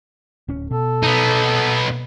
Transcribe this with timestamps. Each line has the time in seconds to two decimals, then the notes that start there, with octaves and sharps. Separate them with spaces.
0.48 D1 C#4
0.71 B2 A4
1.03 B3 D#4